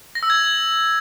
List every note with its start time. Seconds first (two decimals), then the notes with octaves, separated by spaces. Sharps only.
0.15 A#6
0.23 E6
0.30 G#6